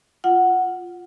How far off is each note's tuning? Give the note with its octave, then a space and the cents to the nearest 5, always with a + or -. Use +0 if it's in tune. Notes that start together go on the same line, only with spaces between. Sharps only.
F4 +0 F#5 +0